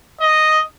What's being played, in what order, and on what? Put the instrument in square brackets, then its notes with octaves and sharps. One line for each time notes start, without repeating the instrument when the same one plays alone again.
[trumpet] D#5